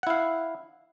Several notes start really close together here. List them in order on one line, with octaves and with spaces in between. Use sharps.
F#5 E4 F5